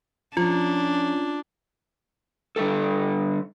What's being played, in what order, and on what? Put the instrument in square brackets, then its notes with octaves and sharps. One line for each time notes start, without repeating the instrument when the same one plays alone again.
[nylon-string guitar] F3 [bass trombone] C#4 [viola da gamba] D4 [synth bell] F4
[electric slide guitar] D3 G3 G4 A4